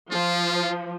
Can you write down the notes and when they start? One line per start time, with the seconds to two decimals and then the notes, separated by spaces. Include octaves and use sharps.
0.11 F3 F4